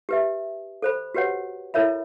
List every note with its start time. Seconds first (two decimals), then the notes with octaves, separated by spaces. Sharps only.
0.09 G4 B4 E5
0.82 A4 C5 B5
1.15 F#4 G4 B4 C#5 F#5
1.74 E4 A4 A#4 C#5 E5 B5